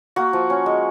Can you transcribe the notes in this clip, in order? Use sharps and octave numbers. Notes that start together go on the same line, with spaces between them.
A#3 F#4
F3
C#4
G#3